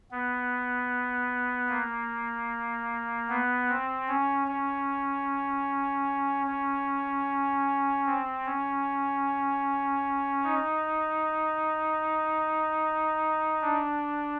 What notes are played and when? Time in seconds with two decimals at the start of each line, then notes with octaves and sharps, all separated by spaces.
0.11 B3
1.69 A#3
3.29 B3
3.69 C4
4.08 C#4
4.48 C#4
6.47 C#4
8.06 C4
8.46 C#4
10.44 D#4
13.61 D4